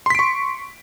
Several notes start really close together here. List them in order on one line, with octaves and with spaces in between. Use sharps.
C6 B6 D7 C#6